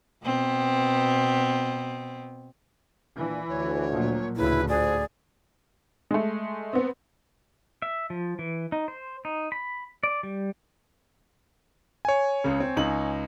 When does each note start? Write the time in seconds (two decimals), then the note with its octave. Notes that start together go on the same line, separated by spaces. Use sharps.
0.23 B2 B3 C4
3.17 A#2 E3 D4
3.49 D2 C#5
3.91 A#2 F3 F#3
4.37 D2 A2 C#3 E4 B4
4.68 F4 G#4 C5 D5
6.11 G#3 A3
6.73 B3 C4
7.82 E5
8.10 F3
8.39 E3
8.72 D#4
8.88 C5
9.25 D#4
9.52 B5
10.03 D5
10.23 G3
12.05 C#5 G#5
12.44 C#2 C#3
12.60 C4
12.77 C#2 D#4 F#7